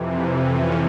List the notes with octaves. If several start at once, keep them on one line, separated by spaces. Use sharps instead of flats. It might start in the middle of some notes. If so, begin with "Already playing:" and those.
Already playing: F2 C3 E3
C#4